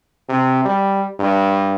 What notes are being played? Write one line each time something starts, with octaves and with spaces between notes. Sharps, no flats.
C3
G3
G2